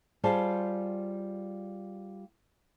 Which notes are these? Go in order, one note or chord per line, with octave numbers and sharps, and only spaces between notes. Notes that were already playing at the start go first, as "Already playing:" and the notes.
G3 F4 G#4 C5 A5